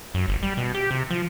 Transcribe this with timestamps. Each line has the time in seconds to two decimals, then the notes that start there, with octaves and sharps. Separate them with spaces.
0.14 F#2
0.28 G1
0.43 G3
0.57 B2
0.75 G4
0.91 C3
1.10 F3